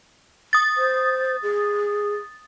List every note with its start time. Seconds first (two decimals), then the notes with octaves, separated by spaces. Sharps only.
0.53 D#6 A6
0.77 C5
1.43 G#4